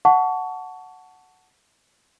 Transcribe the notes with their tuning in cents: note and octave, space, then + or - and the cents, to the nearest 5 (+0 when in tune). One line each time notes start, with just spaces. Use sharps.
F#5 +0 A5 +0 C#6 +25